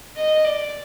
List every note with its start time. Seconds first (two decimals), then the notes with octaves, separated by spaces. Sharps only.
0.16 D#5
0.45 D5